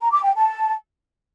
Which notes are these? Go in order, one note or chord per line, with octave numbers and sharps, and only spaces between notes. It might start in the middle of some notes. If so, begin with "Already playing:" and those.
A#5
D6
G5
A5